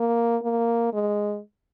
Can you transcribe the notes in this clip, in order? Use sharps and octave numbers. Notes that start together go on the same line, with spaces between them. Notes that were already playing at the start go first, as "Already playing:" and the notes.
Already playing: A#3
A#3
G#3